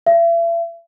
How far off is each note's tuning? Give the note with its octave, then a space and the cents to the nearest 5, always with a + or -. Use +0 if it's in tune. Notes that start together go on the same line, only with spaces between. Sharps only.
E5 +40